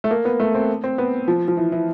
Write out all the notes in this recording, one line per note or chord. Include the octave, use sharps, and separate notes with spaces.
A3
A#3
B3
A3
C4
C4
B3
F3
F3
E3
E3